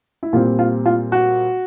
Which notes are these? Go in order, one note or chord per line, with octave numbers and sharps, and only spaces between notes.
E4
A#2 G3 C4 F4
F4
F4
F#4